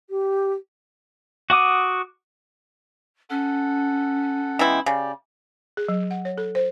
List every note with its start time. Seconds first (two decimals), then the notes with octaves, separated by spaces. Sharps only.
0.10 G4
1.50 F#4 F#5 D6 D#6
3.30 C#4 A4 F#5
4.59 E3 G#3 B3 E4 G5
4.86 C#3 G4 D5
5.77 G#4
5.88 F#3
6.11 F#5
6.25 C#5
6.38 A4
6.55 C5